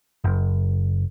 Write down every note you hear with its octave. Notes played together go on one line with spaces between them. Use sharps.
F#1